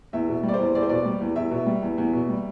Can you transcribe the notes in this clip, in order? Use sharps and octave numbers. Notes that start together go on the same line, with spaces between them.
E2 E5
B2
G3
D5
C5
E2
E2 D5
C5
B2 D5
G3
E2
E2 E5
B2
G3
E2
E2
B2
G3